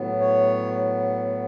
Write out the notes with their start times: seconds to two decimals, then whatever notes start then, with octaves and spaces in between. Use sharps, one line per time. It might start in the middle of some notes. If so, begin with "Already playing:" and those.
Already playing: A2 F#3 B3
0.20 C#5